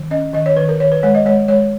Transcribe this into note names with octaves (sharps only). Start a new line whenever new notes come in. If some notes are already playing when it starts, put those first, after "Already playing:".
Already playing: D#3
C#4 D#5
D#3 D#5
C#5
D#3 B4
A#4
D#3 C#5
B4
G#3 C#5
D#5
G#3 C#5
G#3 C#5